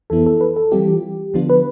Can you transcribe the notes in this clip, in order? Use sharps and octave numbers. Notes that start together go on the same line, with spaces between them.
F2 E3 B3 E4 A4
A4
B4
A4
E3 G3 C4 F4 G4
D3 F3 B3 D4 F4
B4